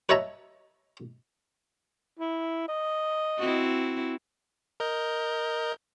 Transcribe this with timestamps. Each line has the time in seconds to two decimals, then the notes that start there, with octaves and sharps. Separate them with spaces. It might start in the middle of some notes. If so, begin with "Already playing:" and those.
0.09 B4 C#5 D#5 E5 A5 A#5
2.19 E4
2.68 D#5
3.38 C4 E4 F#4
4.80 A#4 D#5 G6